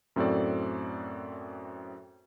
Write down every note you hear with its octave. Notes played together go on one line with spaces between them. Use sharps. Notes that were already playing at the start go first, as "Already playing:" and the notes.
F#2 A2 C4 F#4 A4 D5